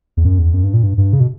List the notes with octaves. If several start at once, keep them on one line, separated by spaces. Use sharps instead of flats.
E2
F#2
E2
F#2
G2
A#2
G2
G2
C#3
B2